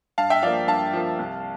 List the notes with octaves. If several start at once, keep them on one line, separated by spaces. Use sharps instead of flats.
G2 F5 A5
E5 G5
F3 A#3 D5 F5
G2 F5 A5
F3 A#3
C2